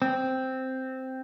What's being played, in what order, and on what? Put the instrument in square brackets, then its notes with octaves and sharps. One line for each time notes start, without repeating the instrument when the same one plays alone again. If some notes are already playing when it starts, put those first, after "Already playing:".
[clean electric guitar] C4